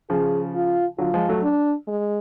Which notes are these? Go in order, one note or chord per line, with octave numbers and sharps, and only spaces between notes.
C#3 F3 G#4
F4
D3 F#3 F4
F3 G#3
F#3 A3
D4
G#3